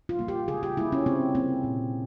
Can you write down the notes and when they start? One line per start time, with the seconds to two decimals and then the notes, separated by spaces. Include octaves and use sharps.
0.09 F4
0.19 G3 A#3
0.28 G4
0.48 C#3 G#4
0.63 G4
0.77 G3 A#3 E4
0.92 C#4
1.06 C#3 C4
1.35 G3 A#3 C4
1.64 A#2